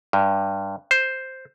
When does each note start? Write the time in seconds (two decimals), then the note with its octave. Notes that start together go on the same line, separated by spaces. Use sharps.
0.13 G2
0.91 C5